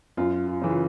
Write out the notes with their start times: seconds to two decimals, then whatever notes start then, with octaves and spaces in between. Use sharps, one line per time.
0.17 F#2 F4
0.48 F4
0.62 C#3 E3
0.70 F4